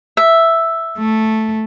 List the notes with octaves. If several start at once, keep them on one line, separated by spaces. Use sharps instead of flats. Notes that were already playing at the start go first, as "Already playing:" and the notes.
E5
A3